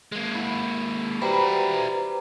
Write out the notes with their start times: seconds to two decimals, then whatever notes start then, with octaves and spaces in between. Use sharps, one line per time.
0.12 G#3 A#3
0.34 E4 F#5
1.22 G3 E4 F#4 B4 C5 A#5